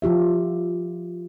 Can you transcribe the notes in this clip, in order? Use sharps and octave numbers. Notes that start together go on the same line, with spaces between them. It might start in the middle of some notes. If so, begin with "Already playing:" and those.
F3 F4 G4 E5